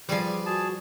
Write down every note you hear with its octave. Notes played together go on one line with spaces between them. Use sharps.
F3 G3 G#4 B4 D5 G#5
F#4 G#4 A5